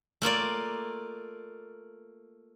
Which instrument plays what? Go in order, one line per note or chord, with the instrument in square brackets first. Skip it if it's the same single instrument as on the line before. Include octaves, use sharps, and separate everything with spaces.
[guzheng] A3 A#3 F4 D5